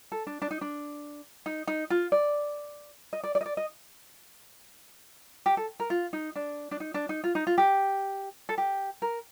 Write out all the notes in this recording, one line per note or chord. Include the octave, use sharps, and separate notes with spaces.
A4
D4
D4
D#4
D4
D#4
D#4
F4
D5
D#5
D5
D5
D#5
D5
D#5
G4
A4
A#4
F4
D#4
D4
D4
D#4
D4
D#4
F4
D#4
F4
G4
A4
G4
A#4